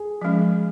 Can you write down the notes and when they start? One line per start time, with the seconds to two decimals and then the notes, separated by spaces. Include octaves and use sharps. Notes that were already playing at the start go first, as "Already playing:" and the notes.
Already playing: G#4
0.21 F3 G#3 C#4